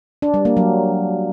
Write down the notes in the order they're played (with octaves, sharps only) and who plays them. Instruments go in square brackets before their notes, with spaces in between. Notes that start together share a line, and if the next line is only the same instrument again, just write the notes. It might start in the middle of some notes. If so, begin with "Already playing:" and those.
[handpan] D4
G3
A#3
F#3